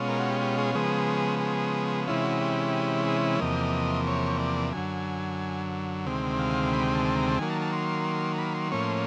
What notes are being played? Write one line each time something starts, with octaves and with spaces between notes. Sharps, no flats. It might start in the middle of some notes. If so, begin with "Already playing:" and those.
Already playing: B2 G#3 C#4 F4
A#4
F#4
G4
G4
G#4
C#3 F3 G#3 B3 G#4
G#4
C3 E3 G#3 C#4 E4 F4
F#4
G4
G#4
E2 C3 F3 A#3 D#5
C#5
D5
F#2 D3 F#3 G#5
D2 C3 D#3 G#3 C4
F5
B5
G5
A5
A5
A#5
A5
D#3 F#3 A#3 G#5
A5
A5
C6
B5
C6
A2 F3 A#3 C#4 C#6
C6